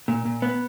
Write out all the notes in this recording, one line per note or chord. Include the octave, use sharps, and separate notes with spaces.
A#2
A#2
B3